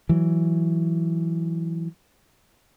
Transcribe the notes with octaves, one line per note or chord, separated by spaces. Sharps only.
E3 F#3